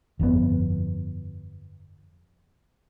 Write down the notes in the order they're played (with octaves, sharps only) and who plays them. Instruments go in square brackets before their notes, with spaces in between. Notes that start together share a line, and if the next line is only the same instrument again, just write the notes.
[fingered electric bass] G1 F2 D3 B3